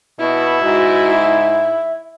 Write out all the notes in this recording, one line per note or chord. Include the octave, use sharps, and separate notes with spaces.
B2 E4
G#2 F#4
E5